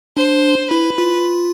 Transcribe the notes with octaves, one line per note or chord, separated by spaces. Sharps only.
D4 C5
E4 B4
F4